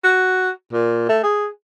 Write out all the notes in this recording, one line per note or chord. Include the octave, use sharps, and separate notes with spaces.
F#4
A#2
A3
G#4